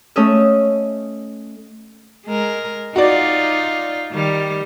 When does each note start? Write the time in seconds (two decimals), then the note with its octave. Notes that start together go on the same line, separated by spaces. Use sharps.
0.16 A3 C#4 D#5 E5
2.27 G#3 A#4
2.96 D#4 F4 F#4 D5
4.12 D#3 G3